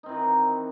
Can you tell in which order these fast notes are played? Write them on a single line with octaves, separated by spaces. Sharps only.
D#4 C4 E3 D#3